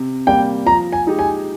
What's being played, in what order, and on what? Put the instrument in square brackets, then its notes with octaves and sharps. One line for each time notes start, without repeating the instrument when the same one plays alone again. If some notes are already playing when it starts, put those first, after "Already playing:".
Already playing: [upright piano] C3
[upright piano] G3 A#3 [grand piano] G5
[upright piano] F3 [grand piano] A#5
[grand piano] G#5
[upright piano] G#3 D#4 G4
[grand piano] G#5